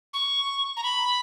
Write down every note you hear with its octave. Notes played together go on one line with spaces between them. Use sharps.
C#6
A#5
B5